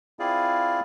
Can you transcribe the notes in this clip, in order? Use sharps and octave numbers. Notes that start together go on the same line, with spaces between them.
C4 E4 F4 G#4 D5 F5